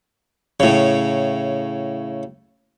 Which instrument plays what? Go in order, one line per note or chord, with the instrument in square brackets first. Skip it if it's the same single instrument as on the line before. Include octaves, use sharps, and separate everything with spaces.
[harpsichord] A2 C#3